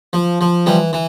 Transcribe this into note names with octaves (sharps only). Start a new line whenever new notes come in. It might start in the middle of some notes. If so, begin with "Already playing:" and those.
F3
F3
E3 G3
E3